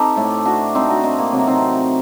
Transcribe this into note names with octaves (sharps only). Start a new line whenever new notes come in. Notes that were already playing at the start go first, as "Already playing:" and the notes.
Already playing: C4 D#4 G4 A4
A2 A3
D4 F#4
C4 D#4
D4 F#4
C4 D#4
A#3
C3 F#3 A3 C4
C4 D#4